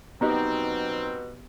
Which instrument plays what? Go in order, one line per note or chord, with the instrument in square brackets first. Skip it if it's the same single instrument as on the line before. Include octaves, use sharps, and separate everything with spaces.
[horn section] F#2 C4 [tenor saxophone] B2 [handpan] B3 G4 D#5 [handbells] D#4 A#5